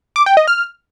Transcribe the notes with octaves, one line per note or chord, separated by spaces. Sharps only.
D6
G5
D#5
F6